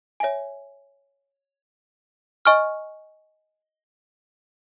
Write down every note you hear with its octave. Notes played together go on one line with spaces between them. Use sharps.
C#5 E5 G#5
D#5 G#5 C#6 F6